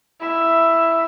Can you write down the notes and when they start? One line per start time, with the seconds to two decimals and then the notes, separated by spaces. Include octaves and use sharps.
0.21 E4 E5